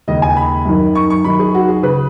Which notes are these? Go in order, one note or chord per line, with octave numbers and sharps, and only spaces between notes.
D#2 C#3 D#5
G#5
B5
F#2 D#3
C#6
C#6
F#2 D#3 B5
G#4
F#4
G#4
C#3 B4